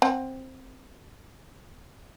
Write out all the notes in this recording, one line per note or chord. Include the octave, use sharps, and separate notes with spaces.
C4 F#5